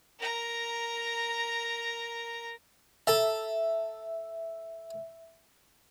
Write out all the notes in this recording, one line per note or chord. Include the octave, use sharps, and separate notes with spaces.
A#4 A#5
A4 E5 A5 A#5